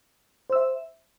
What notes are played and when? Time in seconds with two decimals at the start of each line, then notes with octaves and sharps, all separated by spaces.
0.50 C5
0.52 E6
0.55 E5